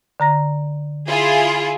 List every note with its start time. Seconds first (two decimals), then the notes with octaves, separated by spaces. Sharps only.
0.20 D3 A#5 A#6
1.08 E4 F4 G#4